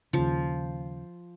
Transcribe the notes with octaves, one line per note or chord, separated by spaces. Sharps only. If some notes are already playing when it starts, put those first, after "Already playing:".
D#2 C#3 F3